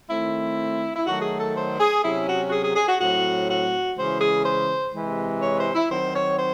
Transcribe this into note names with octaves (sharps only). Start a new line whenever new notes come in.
D#3 A3 C4 E4
E4
D#3 F#3 A3 F#4
G#4
A4
C5
G#4
C3 F#3 C#4 E4
F#4
F#4
G#4
G#4
G#4
F#4
A2 F#3 C4 F#4
F#4
C#3 E3 G#3 C5
G#4
C5
C3 E3 G#3
C#5
C5
E4
D#3 F#3 C4 C5
C#5
C5